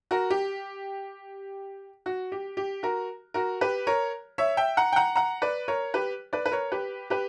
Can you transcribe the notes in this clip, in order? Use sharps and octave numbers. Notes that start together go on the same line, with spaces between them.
F#4 A#4
G4
F#4
G4
G4
F#4 A#4
F#4 A#4
G4 B4
A#4 C#5
C#5 E5
E5 G5
F#5 A#5
G5
F#5 A#5
F#5 A#5
B4 D5
A#4 C#5
G4 B4
B4 D5
B4
A#4 C#5
G4 B4
G4 B4